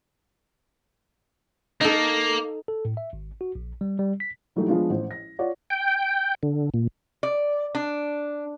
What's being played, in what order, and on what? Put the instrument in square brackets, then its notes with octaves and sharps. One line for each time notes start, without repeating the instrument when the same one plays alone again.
[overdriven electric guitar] A#3 [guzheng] D#4 A4
[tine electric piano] A4
A2
E5
G#1
F#4
A#1
G3
G3
B6
[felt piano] E3 F#3 G3 A3 D#4
F3 G#3 B3 D4 F4
A1 C5
A#6
F4 C#5 D5 F#5
[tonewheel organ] G5
D3
A#2
[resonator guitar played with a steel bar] D5
D4